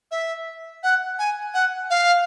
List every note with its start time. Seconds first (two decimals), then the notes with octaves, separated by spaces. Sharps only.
0.11 E5
0.83 F#5
1.19 G#5
1.54 F#5
1.90 F5